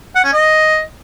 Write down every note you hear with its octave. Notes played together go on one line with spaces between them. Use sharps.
F#5
C#4
D#5